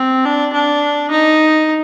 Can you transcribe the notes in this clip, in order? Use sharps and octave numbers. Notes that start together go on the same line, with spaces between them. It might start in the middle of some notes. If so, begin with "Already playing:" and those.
Already playing: C4
D4
D4
D#4